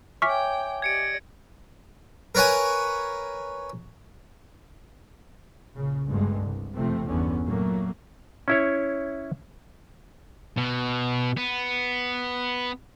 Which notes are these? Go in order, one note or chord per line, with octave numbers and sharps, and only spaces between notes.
C#5 E5 G5 G#5 C#6 D6 F6 B6
G4 D5 D#5 G#6 C#7 D7
A#4 B4 C#5 F#5 G#5
A#1 C#3
G1 D2 G2 D3 G#3
C2
F#1 C3 F3 A3 C4
G1 E2 D3 B3 C#4
A#2 F#3 A3 A#3
C#4 E4 C#5
B2
B3